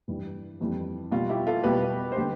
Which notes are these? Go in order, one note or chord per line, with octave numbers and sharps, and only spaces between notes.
G2 E3 G3
F2 E3 G3
B2 G3 F4
E4 G4
F4 A4
B2 G3 G4 B4
C5
D3 G3 G4 B4